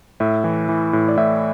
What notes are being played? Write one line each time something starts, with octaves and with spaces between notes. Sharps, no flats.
A2 E5
E3
E3
A2
D5
A2 E5